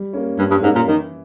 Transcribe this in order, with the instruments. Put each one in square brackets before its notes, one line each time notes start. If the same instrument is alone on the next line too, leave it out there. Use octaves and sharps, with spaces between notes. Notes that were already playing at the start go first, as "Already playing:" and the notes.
Already playing: [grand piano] G3
A#3 C#4
[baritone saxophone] G2 [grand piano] G3
[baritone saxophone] G2
[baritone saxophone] G#2 [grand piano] A#3 C#4
[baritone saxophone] A#2
[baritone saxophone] D#3 [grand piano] E3